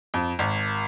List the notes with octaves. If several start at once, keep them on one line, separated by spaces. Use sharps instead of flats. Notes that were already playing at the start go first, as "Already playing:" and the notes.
F2
G#1